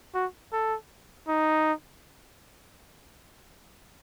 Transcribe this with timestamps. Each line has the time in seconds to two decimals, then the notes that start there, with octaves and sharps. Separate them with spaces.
0.15 F#4
0.53 A4
1.28 D#4